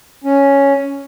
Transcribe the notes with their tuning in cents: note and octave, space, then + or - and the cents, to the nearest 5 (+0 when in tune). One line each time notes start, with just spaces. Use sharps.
C#4 +5